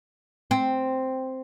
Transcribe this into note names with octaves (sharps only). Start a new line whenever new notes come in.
C4